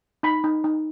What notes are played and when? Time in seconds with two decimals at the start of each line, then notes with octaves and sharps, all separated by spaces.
0.23 D#4 B5
0.44 D#4
0.64 D#4